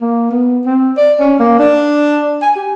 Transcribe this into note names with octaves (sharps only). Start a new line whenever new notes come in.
A#3
B3
C4
D5
C#4
A#3
D4
G#5
G4